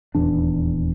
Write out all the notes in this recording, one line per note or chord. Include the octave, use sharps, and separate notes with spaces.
D#1 E2 D4